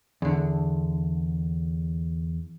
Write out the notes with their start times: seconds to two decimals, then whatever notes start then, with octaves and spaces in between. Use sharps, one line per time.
0.22 E2 D3